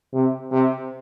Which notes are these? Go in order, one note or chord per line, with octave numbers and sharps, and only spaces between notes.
C3
C3